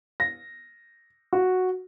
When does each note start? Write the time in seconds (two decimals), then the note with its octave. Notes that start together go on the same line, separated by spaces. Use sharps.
0.20 A#6
1.33 F#4